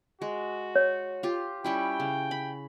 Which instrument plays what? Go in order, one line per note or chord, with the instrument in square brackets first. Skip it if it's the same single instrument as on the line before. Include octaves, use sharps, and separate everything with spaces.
[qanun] G#3 [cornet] F#4
[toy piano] C#5
[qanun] F4 G4
[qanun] G3 C#4 E4 [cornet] G5
[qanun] C#3
B5